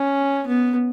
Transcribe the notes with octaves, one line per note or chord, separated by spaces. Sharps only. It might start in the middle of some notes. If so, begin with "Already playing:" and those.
Already playing: C#4
B3